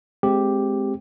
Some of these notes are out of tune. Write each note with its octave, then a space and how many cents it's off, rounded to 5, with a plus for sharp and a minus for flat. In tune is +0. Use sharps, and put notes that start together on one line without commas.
G#3 +20 C4 +0 G4 +0